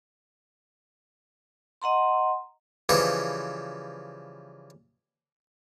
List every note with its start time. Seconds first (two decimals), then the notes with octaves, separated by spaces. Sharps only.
1.82 D#5 F#5 A#5 C6
2.89 C#3 E3 F3 G3 B4